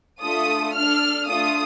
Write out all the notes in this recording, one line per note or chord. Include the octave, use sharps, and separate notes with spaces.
A3 D4 F4 A4 D#6
D4 A4 F6
A3 D4 F4 A4 D#6